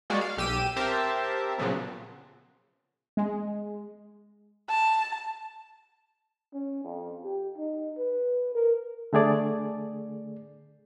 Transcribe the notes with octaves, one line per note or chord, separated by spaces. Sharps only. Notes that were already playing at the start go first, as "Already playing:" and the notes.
G3 G#3 A#3 F#4 D5
F5
B1 G4 E6 D#7
C4 G4 A#4 C5 E5 A5
A#2 C#3 F3 F#3 B3
G#3
A5
C#4
F2
G4
D#4
B4
A#4
D3 A3 G#4 D5